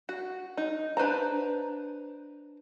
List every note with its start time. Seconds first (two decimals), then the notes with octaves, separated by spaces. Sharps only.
0.09 F#4
0.57 D#4
0.97 D4 B4 C5 A#5